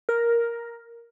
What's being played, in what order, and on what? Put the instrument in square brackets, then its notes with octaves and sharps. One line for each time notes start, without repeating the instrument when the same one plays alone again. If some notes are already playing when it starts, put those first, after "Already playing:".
[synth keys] A#4